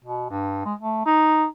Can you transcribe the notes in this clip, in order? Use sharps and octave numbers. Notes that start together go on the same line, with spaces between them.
B2
G2
G#3
A3
D#4